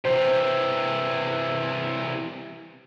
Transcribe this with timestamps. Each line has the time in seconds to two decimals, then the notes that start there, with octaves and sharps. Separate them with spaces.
0.05 C3 E3 C5